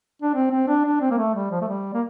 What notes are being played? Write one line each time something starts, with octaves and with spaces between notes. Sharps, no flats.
D4
C4
C4
D4
D4
C4
A#3
A3
G3
F3
A3
G3
A#3